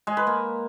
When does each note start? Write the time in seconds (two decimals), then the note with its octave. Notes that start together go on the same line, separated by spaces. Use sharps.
0.07 G#3
0.17 B4
0.27 A#3